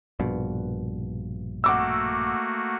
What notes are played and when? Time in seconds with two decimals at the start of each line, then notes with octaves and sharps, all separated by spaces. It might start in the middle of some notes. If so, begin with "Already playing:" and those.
0.20 A#1 G2 B2
1.64 A3 A#3 F#4 F#5 D6 E6